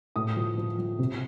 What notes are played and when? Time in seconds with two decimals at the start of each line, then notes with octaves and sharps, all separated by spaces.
0.16 A2 D#6
0.37 F3
0.58 F3
0.78 F3
0.99 C3